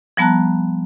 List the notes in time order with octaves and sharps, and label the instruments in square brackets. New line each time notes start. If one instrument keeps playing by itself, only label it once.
[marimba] F3 G3 B3 A5 A#5 F#6